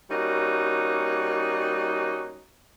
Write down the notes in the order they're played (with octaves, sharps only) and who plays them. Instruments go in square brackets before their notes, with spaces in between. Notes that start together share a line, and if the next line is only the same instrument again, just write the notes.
[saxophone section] G3 A#3 C#4 D#4 F#4